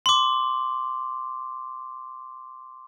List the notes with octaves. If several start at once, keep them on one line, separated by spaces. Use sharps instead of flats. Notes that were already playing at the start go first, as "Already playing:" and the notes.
C6 D6